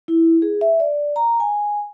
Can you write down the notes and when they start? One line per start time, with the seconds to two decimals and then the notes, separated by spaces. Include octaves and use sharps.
0.08 E4
0.42 G#4
0.61 E5
0.80 D5
1.16 A#5
1.40 G#5